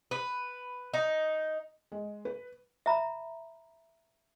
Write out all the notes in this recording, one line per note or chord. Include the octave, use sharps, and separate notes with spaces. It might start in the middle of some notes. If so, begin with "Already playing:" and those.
B4
D#4
G#3
B4
E5 A#5 B5